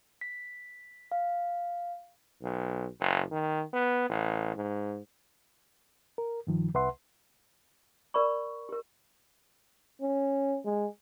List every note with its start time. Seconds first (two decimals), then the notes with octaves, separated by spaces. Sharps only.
0.21 B6
1.12 F5
2.43 B1
3.00 F#1
3.31 D#3
3.73 B3
4.09 A1
4.56 G#2
6.18 A#4
6.47 G2 D#3 F3
6.74 C2 B4 E5 F#5 C6
8.14 A#4 D5 B5 C#6
8.69 G4 A#4
10.01 C#4
10.65 G#3